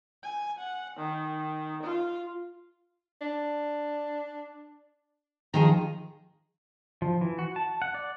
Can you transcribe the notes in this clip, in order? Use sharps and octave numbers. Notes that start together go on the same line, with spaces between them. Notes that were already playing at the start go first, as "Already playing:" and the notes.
G#5
F#5
D#3
F4
D4
D#3 F3 G#4 A#5
F3
E3
F#4
A5
F#5
D5